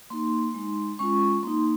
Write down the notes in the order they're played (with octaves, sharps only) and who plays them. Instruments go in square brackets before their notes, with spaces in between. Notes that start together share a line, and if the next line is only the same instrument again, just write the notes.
[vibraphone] A#3 D#4 C6
G#3 D#4
G#3 C#4 F4 C#6
A#3 D#4 C6